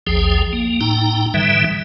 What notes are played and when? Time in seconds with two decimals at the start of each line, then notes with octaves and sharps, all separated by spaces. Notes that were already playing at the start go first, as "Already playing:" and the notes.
0.07 A1 D#2 F3 G#4 G5
0.53 A#3
0.81 A2 D#4 G5 A#5
1.34 G#2 D3 E3 G3 E5